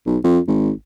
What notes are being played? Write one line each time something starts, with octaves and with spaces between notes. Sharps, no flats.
B1
F2
G#1